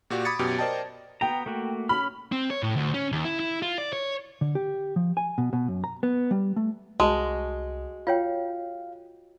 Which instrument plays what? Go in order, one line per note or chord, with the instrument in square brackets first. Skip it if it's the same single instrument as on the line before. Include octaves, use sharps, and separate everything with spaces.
[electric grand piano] A#2 F#4 G4 D5
B5 D6 D#6 G#6 A6 C#7
F#2 B2 G4
A#4 C5 D5 D#5 G5 A5
[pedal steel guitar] B3 A#5 [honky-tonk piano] G5
[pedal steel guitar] A3 A#3 F#4
[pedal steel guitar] C#4 F6 [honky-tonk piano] B5
[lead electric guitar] C4
C#5
A2
D2
C#4
D#2
E4
E4
F4
D5
C#5
[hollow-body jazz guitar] D3
G4
F3
G#5
B2
B2
F#2
A#5
B3
G3
A3
[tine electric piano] C2 [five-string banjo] G#3 [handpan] F#4 D#5 [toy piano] A5
[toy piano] F4 C#5 G5 [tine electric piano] F5